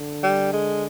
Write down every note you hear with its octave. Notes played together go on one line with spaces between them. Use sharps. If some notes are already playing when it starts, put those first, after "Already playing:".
Already playing: D3
G3
G#3